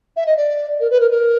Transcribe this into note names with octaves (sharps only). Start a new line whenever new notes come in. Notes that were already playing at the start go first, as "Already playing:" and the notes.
E5
D#5
D5
A#4
B4
A#4
A#4